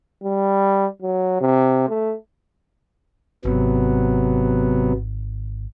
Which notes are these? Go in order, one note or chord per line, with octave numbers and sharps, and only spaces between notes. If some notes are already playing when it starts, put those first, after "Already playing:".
G3
F#3
C3
A3
G#1 C3 F#3 B3